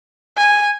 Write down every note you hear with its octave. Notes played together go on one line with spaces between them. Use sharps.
G#5